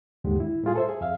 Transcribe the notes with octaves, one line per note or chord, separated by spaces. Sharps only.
D#2 G#2 D3 G#3 G4
E4
A2 G3 F4 G#4
A4 C5 E5
G#4
F2 E5 F5